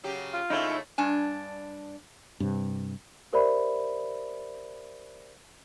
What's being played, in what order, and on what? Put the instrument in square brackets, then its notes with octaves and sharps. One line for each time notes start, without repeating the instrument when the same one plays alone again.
[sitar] C#3 F#3 G4
[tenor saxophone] F4
[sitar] C#3 A3 A#3 [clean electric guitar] D#4 E4 C#5
[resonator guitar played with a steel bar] G2 D4 G#5
[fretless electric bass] G2 C3
[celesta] G4 A#4 C5 D5 E5 B5